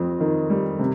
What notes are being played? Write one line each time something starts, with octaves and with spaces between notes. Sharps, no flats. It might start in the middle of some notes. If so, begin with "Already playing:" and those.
Already playing: F2 C4
D#3
G3
C3